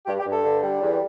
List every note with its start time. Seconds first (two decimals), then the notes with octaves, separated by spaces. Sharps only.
0.06 G2 G4
0.19 G4
0.25 G2
0.31 A4
0.44 D3
0.63 G3
0.82 E2